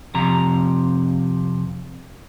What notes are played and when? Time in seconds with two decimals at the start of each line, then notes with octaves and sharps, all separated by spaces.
0.14 F2 C3 A#5